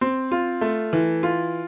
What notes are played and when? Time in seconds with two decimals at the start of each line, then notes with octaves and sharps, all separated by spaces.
0.01 C4
0.32 F4
0.61 A3
0.93 E3
1.23 F4